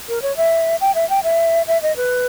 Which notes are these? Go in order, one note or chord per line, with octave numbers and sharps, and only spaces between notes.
A#4
C#5
E5
G5
E5
G5
E5
E5
D#5
B4